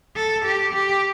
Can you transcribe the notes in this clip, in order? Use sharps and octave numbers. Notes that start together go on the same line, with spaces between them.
A4
G4
G4